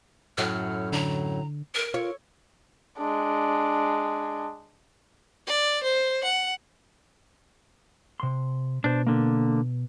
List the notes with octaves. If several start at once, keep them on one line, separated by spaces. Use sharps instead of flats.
F#2 A2 F#3 F6
D3 A#5
A#4
F4 C#5
G#3 D4
D5
C5
F#5
C3 C6
B2 D4 C5
D3 A#3